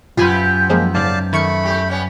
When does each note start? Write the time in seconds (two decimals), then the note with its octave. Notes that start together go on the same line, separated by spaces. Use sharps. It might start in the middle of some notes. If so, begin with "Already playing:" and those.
0.17 B1 F#2 C3 B3 F4 G4 G#5 B5
0.70 F3 G#3 A#3
0.94 G#2 C#3 D5 F5 A5
1.33 D#3 A3 B5 C#6 C#7
1.63 A2 G4
1.88 G3 B3 C#4